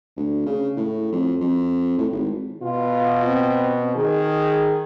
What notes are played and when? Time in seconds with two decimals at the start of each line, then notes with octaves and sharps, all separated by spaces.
0.17 D2
0.46 C#3
0.77 A2
1.12 F2
1.41 F2
1.98 A2
2.12 G#1
2.62 B2 F4
3.24 C4
3.96 D#3 G#4